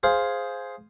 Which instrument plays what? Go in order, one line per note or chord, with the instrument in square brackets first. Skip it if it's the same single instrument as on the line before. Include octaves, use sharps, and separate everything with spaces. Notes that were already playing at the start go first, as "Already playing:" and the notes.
[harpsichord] G#4 C5 F5